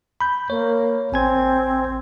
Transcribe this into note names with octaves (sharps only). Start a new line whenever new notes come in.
B5 G6
A#3 C#5
A1 C4 G#5 G#6